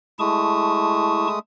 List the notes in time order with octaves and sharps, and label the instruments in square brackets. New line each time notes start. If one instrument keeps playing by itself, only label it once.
[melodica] G#3 A3 D#6 [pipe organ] E4 A5 C#6